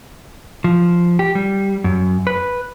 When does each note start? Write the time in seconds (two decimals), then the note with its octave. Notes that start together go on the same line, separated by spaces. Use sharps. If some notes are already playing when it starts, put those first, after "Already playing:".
0.64 F3
1.19 G4
1.35 G3
1.84 F#2
2.27 B4